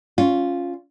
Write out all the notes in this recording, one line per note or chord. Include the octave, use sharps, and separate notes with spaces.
C#4 F4